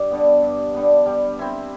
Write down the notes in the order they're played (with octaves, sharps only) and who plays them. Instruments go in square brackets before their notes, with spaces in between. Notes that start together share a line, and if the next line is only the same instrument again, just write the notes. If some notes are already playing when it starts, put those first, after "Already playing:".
Already playing: [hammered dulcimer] G2
D3 G3 B3
G2
D3 G3 B3
G3
C4 E4